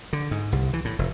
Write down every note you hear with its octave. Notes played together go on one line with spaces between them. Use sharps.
D3
G#2
C2
E3
A2
F1